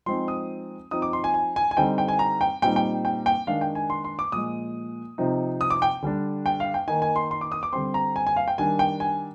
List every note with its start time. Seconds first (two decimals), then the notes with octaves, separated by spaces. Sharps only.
0.06 F3 G#3 C4 D#4 C6
0.28 D#6
0.91 F3 C4 D#4 D#6
1.02 D6
1.13 C6
1.24 G#5
1.34 G#5
1.56 G#5
1.71 G#5
1.77 D3 G3 C4 D#4 G5
1.98 G5
2.08 G#5
2.19 A#5
2.41 G5
2.62 A#2 G3 C4 D#4 G5
2.76 G5
3.05 G5
3.26 G5
3.47 D#3 G#3 D4 F5
3.61 G5
3.75 G#5
3.90 C6
4.04 C6
4.19 D6
4.32 A#2 F3 G#3 D#6
5.18 C3 F3 C4 D#4
5.61 D#6
5.70 D6
5.82 G5
6.02 D3 G3 D4
6.46 G5
6.60 F5
6.74 G5
6.88 D#3 A#3 D#4 G#5
7.02 G#5
7.16 C6
7.31 C6
7.41 D6
7.52 D#6
7.63 D6
7.73 D3 G3 C4 C6
7.94 A#5
8.16 G#5
8.27 G#5
8.36 F5
8.48 G5
8.58 D#3 G3 D4 G#5
8.79 G5
9.00 G#5